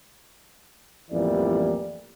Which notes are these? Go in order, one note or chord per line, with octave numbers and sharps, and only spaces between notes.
A1 F2 E3 G3 A#3 D5